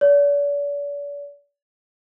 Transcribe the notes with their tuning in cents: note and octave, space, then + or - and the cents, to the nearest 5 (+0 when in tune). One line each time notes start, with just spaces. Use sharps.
D5 -40